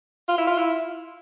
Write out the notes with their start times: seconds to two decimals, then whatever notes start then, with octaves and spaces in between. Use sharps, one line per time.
0.28 F4
0.38 E4
0.47 F4
0.58 E4